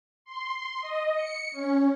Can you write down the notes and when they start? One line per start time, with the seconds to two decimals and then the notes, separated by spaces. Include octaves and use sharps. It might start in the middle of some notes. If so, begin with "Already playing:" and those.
0.25 C6
0.81 D#5
1.15 C#7
1.52 C#4